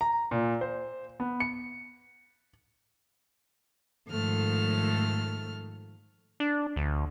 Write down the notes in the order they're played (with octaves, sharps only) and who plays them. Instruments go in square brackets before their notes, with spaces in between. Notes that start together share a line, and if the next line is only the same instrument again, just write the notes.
[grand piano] A#5
A#2
C5
B3
C#7
[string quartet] G#2 D#3 F3 A3 A4 F6
[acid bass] D4
D2